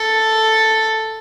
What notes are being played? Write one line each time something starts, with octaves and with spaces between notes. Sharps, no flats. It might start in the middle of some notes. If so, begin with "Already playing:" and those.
Already playing: A4